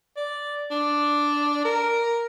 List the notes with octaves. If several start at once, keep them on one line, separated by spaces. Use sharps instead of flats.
D5
D4
A#4